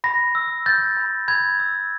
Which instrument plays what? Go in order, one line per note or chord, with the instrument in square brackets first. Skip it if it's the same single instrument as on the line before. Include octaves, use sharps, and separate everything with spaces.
[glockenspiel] B5 A#6
E6
G6 A6
B5
B5 G#6
E6